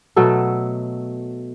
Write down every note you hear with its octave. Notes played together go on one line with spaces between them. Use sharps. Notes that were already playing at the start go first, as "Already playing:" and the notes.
B2 F#3 A3 A4